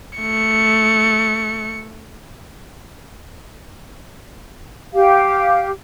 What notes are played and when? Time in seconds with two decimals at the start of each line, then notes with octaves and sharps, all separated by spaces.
0.19 A3 C#7
4.94 G4 F5